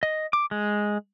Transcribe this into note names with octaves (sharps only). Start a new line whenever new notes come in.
D#5
D6
G#3